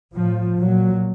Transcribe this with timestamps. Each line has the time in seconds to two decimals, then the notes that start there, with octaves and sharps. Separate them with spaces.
0.14 A2 F3
0.59 A#2 F#3